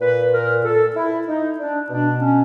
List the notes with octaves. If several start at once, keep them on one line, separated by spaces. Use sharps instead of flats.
A#2 B4
A#4
A4
E4
D#4
D4
B2 D4
C#4